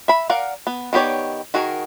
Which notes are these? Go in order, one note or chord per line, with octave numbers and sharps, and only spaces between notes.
E5 B5
A#4 D5 F5 F#5
B3
D#3 B3 G4 C#5 D5
D#3 F#4 G#4 A#4